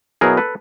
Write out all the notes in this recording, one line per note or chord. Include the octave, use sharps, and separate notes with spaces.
B2 F#3 B3 E4 G#4 A#4
A4 B4